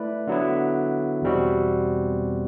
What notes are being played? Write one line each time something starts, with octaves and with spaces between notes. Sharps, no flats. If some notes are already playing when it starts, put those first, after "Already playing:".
Already playing: A3 E4 B4 D5
D3 F#3 B3 E4
E2 B2 G3 C4 F#4